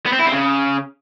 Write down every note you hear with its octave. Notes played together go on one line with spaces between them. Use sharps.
B3
C4
E4
C4
C#3